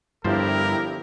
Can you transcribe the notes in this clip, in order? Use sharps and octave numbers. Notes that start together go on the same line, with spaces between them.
G1 G2 F3 E4 G4 A#4 C5